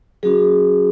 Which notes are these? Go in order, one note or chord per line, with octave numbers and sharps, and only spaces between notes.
F#3 C#4 F#4 G#4